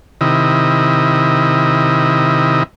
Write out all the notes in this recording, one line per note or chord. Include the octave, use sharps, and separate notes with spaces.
C3 D#3 E4 D#5